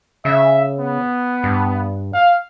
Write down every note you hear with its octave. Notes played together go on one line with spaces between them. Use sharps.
C#3 E5
B3
G2
F5